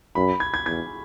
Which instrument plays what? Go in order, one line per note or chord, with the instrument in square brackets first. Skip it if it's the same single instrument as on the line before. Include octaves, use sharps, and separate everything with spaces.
[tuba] F#2 [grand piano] B5
[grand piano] G#6
G#6
[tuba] E2 [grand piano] G#6